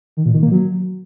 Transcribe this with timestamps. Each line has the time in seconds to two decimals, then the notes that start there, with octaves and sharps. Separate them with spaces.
0.17 D#3
0.26 A#2
0.34 D#3
0.43 A#3
0.51 F#3